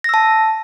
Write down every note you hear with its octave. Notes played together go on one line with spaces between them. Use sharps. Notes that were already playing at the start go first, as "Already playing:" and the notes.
A5 E6 A#6